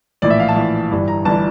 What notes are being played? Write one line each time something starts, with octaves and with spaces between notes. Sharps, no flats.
A#1 A2 E3 D5
E5
F5
A5
A#1 A2 E3
G1 G2 E3 G3
A#5
G1 E3 G3 A5